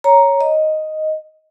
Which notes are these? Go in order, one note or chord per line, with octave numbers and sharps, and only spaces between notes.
C#5 A#5
D#5